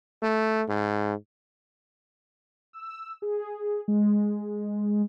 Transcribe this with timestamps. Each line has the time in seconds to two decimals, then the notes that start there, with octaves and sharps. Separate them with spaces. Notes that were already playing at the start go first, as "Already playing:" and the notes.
0.23 A3
0.69 G#2
2.73 E6
3.22 G#4
3.88 G#3